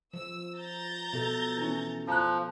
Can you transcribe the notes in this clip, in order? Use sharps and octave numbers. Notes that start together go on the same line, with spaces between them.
F3 E6
A#5 G6 A6
B2 A4
E3 C#4
F3 A#5 F#6